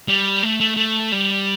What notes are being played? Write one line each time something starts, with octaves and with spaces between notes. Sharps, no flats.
G3
A3
A3
A3
G3